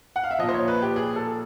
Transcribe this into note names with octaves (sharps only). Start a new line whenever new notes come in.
F#5
F5
E5
A#2 F3 D#5
C5
C#5
B4
G4
G#4
A4